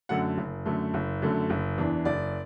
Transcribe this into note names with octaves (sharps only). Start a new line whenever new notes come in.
F#2 D3 A3 F#5
F#1
F#2 D3 A3
F#1
F#2 D3 A3
F#1
E2 E3 D4
F#1 D5